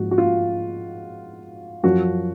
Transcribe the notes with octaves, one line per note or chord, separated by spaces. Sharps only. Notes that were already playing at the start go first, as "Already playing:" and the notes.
Already playing: G#2 F3 F#4
F#4
F4
F#2 F3 F#4